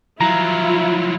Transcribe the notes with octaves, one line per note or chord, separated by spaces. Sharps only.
F3 F#3 E4 F4 A#5